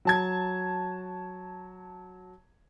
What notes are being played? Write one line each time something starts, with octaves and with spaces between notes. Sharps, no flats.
F#3 A5 G#6